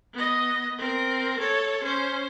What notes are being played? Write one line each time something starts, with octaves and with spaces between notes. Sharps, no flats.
B3 D#5
C4 A#4
A4 C#5
C#4 C5